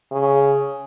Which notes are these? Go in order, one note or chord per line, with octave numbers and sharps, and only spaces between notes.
C#3